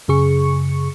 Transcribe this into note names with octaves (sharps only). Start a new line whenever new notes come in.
F#2 C#3 G#4 C#6 C#7